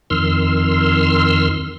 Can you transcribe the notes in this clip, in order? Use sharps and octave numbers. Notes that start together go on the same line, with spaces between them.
F2 D#3 C6 E6 F6